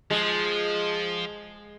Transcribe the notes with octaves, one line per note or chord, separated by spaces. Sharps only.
F3 G#3